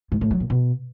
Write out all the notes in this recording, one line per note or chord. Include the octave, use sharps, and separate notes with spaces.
G#2
A2
F#3
A#2
B2